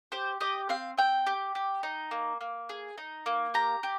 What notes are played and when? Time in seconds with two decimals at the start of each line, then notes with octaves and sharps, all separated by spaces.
0.12 G4 C5
0.40 G4 D#5
0.69 C4 F5
0.98 C4 G5
1.27 G4
1.55 G4
1.83 D#4
2.11 A#3
2.41 A#3
2.69 G#4
2.98 D#4
3.26 A#3
3.54 G4 A#5
3.83 G4